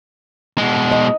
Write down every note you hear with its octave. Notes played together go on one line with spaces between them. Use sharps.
B2 G#3
D#5